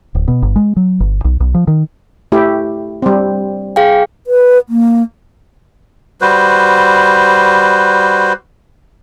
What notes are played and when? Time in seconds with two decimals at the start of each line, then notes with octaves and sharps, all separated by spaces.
0.15 D1
0.28 B2
0.43 G1
0.56 G#3
0.77 F#3
1.00 G1
1.25 B1
1.40 B1
1.55 F3
1.68 D#3
2.32 A3 E4 G4
3.02 G3 C4
3.76 G#4 F5 G5
4.27 B4
4.69 A#3
6.21 G3 F#4 B4 C5